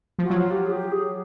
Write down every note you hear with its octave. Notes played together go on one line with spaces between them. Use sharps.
F3 F#4
F#3 F4
G4
G#4
G4
G#4